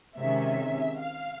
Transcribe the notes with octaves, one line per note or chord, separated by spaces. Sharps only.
C3 D#3 G#3 C#4 E5
F5